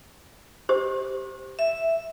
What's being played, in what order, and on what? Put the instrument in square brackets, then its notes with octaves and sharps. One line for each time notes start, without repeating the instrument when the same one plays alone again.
[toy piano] G4 C5
[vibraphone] E5